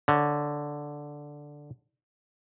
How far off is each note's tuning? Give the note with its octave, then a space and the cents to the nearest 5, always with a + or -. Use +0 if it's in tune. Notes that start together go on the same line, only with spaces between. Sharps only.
D3 +0 C#5 +0